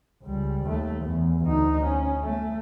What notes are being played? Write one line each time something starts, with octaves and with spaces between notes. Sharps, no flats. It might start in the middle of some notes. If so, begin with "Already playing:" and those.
C#2 G3
D#2 A3
E2
D2 D#4
C#4
A3